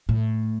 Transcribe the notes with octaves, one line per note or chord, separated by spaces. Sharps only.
A2